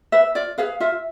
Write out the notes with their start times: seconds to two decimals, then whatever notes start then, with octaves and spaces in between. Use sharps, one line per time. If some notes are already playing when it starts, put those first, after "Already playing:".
0.12 B4 E5
0.35 F4 D5
0.58 G#4 B4 F5
0.80 F4 E5